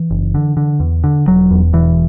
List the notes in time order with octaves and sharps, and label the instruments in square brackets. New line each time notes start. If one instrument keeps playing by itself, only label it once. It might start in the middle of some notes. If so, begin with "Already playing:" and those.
Already playing: [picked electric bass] E3
F#1
D3
D3
E2
D3
E1 F#3
E2
E1 E3